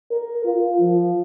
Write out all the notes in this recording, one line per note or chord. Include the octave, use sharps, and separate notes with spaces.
A#4
F4
F3